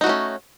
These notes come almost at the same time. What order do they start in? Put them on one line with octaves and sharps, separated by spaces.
D#4 F#4 A3 C#4